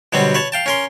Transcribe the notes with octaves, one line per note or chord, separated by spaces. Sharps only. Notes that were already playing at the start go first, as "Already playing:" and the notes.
B2 D3 F#3 G3 C4
B4 C#5 A5
F5 G5 A5
C#4 A#4 C6